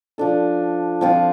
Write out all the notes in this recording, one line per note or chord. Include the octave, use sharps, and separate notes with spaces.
F3 D4 A4
F3 C4 F4 C5